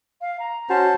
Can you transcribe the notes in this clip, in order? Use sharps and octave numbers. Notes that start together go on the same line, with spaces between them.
F5
A#5
C#4 F#4 C5 A5